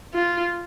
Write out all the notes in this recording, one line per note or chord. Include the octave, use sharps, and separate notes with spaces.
F4